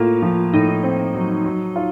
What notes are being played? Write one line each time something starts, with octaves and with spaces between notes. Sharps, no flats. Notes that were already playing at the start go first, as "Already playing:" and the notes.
Already playing: A2 A#3 F4
F3
A2 D#4
C4
F#3
F#3
F4